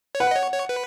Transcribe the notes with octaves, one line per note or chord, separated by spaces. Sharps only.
C#5
B4 F#5
D#5
C#5
C#5
B4